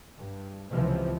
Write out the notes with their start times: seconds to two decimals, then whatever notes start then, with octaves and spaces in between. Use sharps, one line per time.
0.17 G2
0.71 C#2 C3 E3 F3